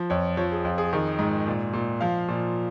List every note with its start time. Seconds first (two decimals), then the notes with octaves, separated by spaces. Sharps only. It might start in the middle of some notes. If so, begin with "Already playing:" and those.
Already playing: F3
0.10 F2 C#5
0.37 F3 C#5
0.52 G#4
0.64 F2 F4
0.78 G#4
0.93 D#3
1.19 G#2
1.47 A#2
1.73 A#2
2.01 F3 F5
2.28 A#2